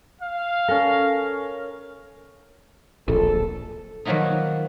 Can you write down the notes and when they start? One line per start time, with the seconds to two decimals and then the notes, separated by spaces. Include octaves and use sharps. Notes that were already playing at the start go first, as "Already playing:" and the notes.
0.21 F5
0.68 C#4 A4 A#4
3.08 D1 A#1 A4
4.05 D#3 F3 F#3 A#3 B3 D#4